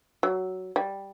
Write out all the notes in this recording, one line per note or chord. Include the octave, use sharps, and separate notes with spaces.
F#3
G3